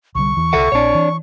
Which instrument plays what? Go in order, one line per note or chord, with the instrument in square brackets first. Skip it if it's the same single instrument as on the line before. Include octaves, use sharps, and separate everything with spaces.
[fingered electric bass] C2 D3 G3 [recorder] C#6
[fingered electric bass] E2 E3
[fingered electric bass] C2 [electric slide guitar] A4 E5 F#5
[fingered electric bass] A#1 [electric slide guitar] D4 C#5
[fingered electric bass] E3